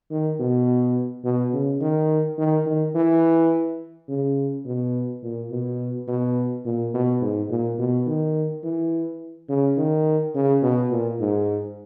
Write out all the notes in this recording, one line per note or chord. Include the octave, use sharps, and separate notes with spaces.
D#3
B2
B2
C#3
D#3
D#3
D#3
E3
C#3
B2
A#2
B2
B2
A#2
B2
G#2
A#2
B2
D#3
E3
C#3
D#3
C#3
B2
A#2
G#2